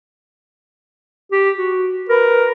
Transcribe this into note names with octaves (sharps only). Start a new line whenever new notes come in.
G4
F#4
A#4 B4